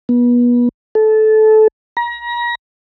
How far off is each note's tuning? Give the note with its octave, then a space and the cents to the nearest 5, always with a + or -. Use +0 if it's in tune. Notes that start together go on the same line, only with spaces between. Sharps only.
B3 -30
A4 -20
A#5 +35